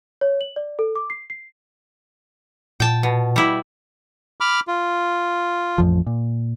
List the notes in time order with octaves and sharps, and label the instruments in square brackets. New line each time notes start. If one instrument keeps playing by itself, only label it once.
[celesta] C#5
F#7
D5
A4
D6
C7
C7
[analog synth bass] A#2 [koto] G5 A5
[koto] B2
G3 E4
[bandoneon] B5 D6 F6
F4
[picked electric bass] A1 F2 F3
A#2